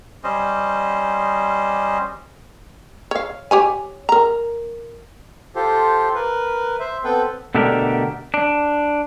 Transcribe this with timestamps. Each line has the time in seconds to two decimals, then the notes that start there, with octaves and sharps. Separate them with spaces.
0.24 G3 C#4 C5 D#5
3.11 C#5 F5
3.51 G4 C#5 G#5
4.09 A#4 A#5
5.55 F4 G4 A4 C5
6.15 A#4 B4
6.79 C5 E5
7.04 B3 C4 A4 B4 G5
7.55 B2 D3 A3 D4 G4 A#4
8.34 D4